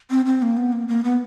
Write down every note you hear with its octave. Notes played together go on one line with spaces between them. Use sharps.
C4
C4
A#3
B3
A#3
A#3
B3